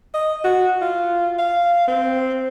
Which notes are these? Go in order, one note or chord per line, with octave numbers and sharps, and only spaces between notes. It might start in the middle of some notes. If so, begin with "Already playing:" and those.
D#5
F#4
F4
F5
C4